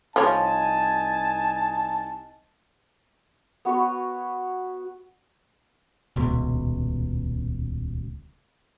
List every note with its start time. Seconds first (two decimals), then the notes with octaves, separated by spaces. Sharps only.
0.16 C2 F3 D#4 C#5 G#5 A5
3.65 B3 F#4 B4 C#5
6.16 D#1 C#2 B2